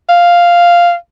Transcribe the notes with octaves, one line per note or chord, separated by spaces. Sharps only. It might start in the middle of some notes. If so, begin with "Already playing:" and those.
F5